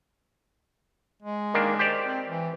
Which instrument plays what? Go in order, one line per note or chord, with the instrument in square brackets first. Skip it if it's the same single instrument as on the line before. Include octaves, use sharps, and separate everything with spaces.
[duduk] G#3
[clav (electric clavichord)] D#3 A#3 D4
G4 C5 D5
[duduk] C4
E3